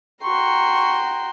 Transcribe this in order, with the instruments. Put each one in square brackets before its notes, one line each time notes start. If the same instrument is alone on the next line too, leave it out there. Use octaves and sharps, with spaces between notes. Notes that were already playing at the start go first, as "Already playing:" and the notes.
[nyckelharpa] F#4 A#5 [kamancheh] G5 C6 [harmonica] C#6